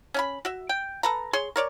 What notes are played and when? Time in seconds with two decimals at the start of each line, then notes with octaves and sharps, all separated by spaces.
0.14 C#4 G#5 B5
0.45 F#4 E5
0.69 G5
1.03 A4 B4 A#5
1.33 G#4 C#5 C6
1.56 A#4 C#5 D5